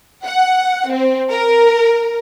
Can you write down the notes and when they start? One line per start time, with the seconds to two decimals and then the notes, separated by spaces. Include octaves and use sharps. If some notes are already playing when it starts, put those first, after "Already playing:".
0.23 F#5
0.90 C4
1.30 A#4